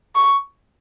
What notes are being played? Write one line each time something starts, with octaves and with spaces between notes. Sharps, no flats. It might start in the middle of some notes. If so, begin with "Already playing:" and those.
C#6